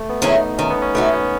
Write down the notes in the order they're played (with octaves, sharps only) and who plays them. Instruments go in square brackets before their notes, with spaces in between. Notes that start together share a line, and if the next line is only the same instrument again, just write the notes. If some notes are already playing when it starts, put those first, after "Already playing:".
Already playing: [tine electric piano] A3
B3
[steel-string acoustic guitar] D#3 G#3 C#4 E4
[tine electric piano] D#4
[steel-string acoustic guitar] D#3 [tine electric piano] C#4
[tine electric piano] B3
C#4
[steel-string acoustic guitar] A3 D#4 F#4 [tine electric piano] B3
[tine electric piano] C#4
B3